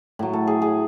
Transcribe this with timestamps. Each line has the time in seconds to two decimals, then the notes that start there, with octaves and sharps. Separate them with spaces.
0.19 A2 F#3
0.33 A4
0.47 G#4
0.62 G#4